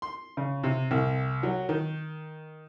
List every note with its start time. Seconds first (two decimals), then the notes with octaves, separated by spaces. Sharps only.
0.02 C6
0.37 C#3
0.64 C3
0.91 C2
1.43 F#3
1.69 D#3